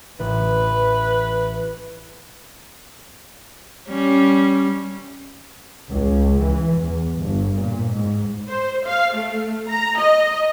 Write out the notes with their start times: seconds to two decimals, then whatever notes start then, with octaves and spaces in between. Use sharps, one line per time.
0.19 A1 B4
3.88 G3 C#4
5.89 C#2
6.42 E3
6.77 E2
7.18 G1
7.60 A#2
7.91 G#2
8.49 C5
8.86 F5
9.14 A3
9.68 A#5
9.98 D#5